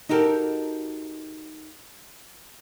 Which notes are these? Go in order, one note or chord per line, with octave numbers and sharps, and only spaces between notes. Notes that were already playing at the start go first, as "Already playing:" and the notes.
D#4 F#4 G4 A4 A#4